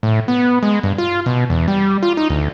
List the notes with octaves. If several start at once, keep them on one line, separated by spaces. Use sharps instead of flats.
A2
B3
G#3
G2
F4
B2
E2
G3
F4
D#4
D2